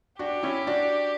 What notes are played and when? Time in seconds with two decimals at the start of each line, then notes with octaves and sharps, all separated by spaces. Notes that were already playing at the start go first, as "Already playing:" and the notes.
0.19 D4 F#4 G4
0.43 C#4 E4
0.67 D4 F#4